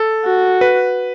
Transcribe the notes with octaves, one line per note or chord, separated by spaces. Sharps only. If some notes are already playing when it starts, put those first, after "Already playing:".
Already playing: A4
F#4
B4